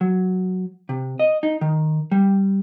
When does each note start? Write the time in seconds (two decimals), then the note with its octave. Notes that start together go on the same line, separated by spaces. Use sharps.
0.01 F#3
0.89 C3
1.19 D#5
1.43 D#4
1.61 D#3
2.12 G3